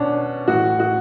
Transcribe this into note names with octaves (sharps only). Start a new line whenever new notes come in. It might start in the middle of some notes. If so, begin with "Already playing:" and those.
Already playing: B2 C#4 D4
A2 E3 F#4
F#4